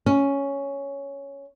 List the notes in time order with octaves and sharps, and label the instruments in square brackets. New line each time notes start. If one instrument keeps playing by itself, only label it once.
[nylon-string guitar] C#4